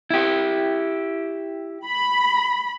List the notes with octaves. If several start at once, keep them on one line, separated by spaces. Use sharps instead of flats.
E4 G4
B5